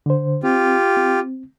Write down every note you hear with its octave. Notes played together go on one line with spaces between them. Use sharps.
D3 C5
C4 F4 G4
C4